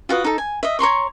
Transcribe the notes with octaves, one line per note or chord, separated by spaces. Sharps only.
F4 F#4 B4 D#6
D#4 A4
G#5
D#5 E5
C#5 A#5 C6 C#6